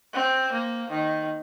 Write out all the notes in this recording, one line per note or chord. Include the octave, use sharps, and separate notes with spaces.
C4
A#3
D#3